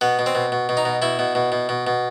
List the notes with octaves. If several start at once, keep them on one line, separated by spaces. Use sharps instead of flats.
B2 B3
B2
C4
B2
B2
B2
D#4
B2
B2 E4
B2
B2
B2
B2
B2